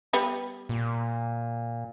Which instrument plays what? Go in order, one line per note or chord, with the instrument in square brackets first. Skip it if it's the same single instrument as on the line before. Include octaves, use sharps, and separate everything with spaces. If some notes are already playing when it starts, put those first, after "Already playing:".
[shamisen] G3 B3 B4
[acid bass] A#2